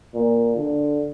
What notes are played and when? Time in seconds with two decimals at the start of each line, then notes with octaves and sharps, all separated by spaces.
0.14 A#2
0.56 D3